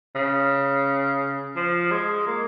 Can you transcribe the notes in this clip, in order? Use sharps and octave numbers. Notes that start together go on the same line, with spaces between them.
C#3
F3
G#3
A#3